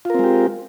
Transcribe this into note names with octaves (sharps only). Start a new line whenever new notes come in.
G#3 C4 F4 G4 A#4